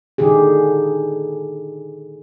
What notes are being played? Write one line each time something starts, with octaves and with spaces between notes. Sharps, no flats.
A#2 D3 D#3 D#4 G4 G#4